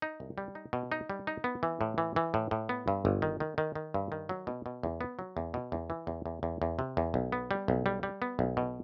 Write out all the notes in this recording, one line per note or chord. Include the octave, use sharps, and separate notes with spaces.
D#4
C2
G3
D#4
B2
D#4
G3
D#4
B3
E3
A2
E3
E3
A2
A2
B3
G2
G1
D#3
D#3
D#3
D#3
G2
D#3
F#3
B2
B2
E2
B3
F#3
E2
B2
E2
E3
E2
E2
E2
E2
C3
E2
B1
B3
G3
B1
G3
G3
B3
B1
B2